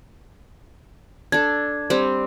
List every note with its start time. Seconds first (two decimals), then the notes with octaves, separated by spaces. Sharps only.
1.32 D4 A4 G#6
1.90 G3 C4